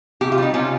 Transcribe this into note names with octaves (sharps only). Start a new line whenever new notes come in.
C3 G4
F4
G3 D#4
C3 C#4 F4